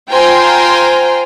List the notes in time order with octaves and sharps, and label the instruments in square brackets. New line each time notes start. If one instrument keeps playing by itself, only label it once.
[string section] F4 C5 G5 G#5 A#5 C6